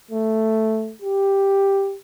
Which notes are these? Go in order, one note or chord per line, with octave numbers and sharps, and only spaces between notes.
A3
G4